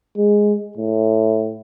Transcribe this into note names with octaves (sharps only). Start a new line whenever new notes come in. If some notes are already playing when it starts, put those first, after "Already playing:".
G#3
A2